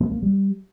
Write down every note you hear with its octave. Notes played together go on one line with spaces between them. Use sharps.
A#3
A#3
G3